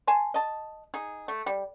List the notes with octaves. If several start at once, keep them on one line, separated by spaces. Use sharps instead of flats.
G#5 A5 C6
D#5 A5
D#4 G#4
A3
G3